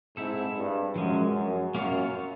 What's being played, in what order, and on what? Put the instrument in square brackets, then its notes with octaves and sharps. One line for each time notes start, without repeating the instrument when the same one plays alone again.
[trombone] G#2 [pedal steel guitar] C4 E4 A4
[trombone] G2
[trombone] F#2 [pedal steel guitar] F3 G#3 C#4
[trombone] F#2
[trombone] F#2 [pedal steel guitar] A#3 C#4 F4 A#4 C#5